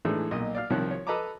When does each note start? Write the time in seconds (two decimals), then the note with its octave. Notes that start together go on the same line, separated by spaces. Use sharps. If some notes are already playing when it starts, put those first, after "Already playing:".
0.05 A2 E3 G#3 A3 D4 D#4
0.31 B1 A#2 D#5
0.55 D5 F5 F6
0.70 C2 D#3 F3 C4 C#5 F#6
0.91 C#5
1.07 A4 B4 D#5 A5 A#5 D6